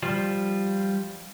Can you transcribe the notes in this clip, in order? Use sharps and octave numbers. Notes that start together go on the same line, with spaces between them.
F3 G3 F4